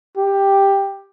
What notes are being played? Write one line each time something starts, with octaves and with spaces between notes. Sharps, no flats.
G4